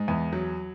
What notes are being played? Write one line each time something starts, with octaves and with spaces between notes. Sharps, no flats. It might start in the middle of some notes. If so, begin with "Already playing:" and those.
Already playing: G#2
E2
F#3